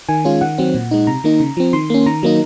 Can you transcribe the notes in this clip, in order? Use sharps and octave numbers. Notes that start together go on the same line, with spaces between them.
D#3 G#5
G#3 C#4 F4
D#3 F#5
F#3 C4
A#2
G#3 D#4
C3 A#5
D#3 A#3 D#4
C#3
F3 C4
D#3 C6
A#3 C#4
D#3 A#5
F#3 A#3 D#4